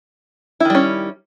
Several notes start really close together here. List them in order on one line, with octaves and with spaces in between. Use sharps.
E4 D#3 G3 C#4